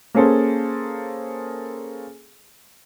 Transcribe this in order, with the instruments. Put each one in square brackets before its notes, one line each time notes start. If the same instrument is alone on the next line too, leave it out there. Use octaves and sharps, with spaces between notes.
[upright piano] A#3 C#4 G#4 A4 C5